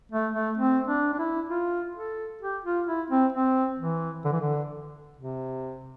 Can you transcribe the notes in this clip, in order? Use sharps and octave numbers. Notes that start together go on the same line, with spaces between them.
A3
A3
C4
D4
D4
E4
F4
A4
G4
F4
E4
C4
C4
E3
D3
E3
D3
C3